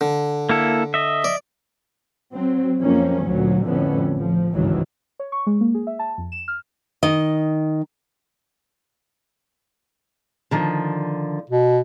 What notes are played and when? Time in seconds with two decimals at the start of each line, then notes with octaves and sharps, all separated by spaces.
0.01 D3
0.49 A#3 E4 A4
0.94 D#5 E5
1.24 D5
2.35 F#3 C4
2.80 F2 F3 A#3 C#4
3.24 D2 A#2 F#3
3.65 F2 A2 D3 B3 C#4
4.13 A1 F3
4.52 G#1 C#2 G2 D#3 E3 F#3
5.19 C#5
5.32 C#6
5.47 G#3
5.61 A#3
5.74 G#4
5.87 E5
5.99 A5
6.18 F2
6.32 E7
6.48 F6
7.03 D#3 D#5
10.51 D3 D#3 F3
11.50 B2